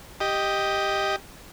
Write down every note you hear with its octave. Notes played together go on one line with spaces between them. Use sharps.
G4 D#5